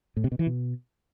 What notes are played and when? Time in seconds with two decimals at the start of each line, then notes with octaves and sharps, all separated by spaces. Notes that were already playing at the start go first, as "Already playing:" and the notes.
0.17 A2
0.24 C3
0.32 B2
0.39 E3
0.47 B2